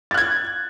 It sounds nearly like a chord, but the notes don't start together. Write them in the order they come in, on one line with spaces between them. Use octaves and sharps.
A6 F#6 G#6